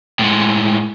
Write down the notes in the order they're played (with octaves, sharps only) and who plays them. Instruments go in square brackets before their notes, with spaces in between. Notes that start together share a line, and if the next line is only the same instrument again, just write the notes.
[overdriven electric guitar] A2 G#3